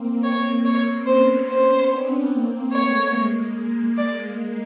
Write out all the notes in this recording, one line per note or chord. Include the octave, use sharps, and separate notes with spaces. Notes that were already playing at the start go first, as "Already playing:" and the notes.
Already playing: A#3 C4
C#5
C#5
B3 C#4 C5
C5
C4 D4
A#3 C4
A3 B3 C#5
G#3 A#3
G#3 A#3 D5